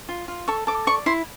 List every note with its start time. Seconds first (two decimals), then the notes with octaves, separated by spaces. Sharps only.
0.09 F4
0.28 F4
0.48 A4 C#6
0.67 A4 D6
0.87 D5 C#6
1.06 E4 C6